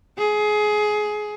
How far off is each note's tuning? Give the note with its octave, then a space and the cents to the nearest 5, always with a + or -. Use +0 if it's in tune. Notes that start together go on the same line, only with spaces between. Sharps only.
G#4 +20